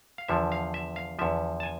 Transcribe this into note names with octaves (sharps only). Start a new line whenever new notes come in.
F5
E2 D3 F3 E5
F5
E5
F5
E2 D3 F3 E5
A5
G#5